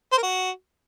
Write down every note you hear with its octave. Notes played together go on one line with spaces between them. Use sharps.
C5
A#4
F#4